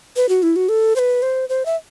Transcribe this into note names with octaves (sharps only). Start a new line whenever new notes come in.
B4
F#4
E4
F#4
A4
C5
B4
C5
C5
E5